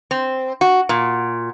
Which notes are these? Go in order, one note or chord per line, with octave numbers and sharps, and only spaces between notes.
C4
F#4
A#2